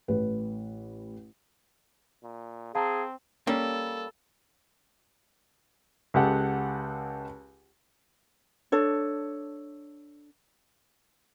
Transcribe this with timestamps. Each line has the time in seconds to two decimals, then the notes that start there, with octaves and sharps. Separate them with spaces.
0.08 A1 B4
2.23 A#2
2.75 C4 G#4 F5 A5 A#5
3.47 G3 A#3 C#4 A4
6.14 C#2 G#3 G4 A4 F#5
8.72 D4 A4 C#5